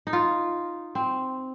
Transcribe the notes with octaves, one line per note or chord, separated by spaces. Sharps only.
D#4
F4
C4